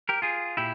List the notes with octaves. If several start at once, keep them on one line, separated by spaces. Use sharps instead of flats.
G4 A#4
F4 G#4
A#2 E4 G4